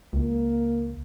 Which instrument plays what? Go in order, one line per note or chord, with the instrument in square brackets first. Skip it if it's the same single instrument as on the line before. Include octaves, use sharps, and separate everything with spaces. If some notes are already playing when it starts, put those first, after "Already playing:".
[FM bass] C#2 [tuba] A#3